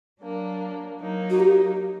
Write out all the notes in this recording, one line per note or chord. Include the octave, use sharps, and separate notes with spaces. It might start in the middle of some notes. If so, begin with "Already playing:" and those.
F#3 A#3 D4
F#3 A#3 D#4
F#4
G4